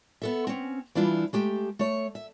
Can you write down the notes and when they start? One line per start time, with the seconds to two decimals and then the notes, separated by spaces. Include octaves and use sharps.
0.22 B3 A4 E5
0.47 C4 C#4
0.95 E3 G3 D4 E4 F4
1.33 G#3 A3 G4
1.79 A3 C#5
2.15 E5